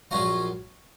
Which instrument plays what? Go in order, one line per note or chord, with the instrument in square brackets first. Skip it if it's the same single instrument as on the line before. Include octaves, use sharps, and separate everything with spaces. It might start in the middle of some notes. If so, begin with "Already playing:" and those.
[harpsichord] A#1 A#2 F#3 C#4 F4 A#5 C#6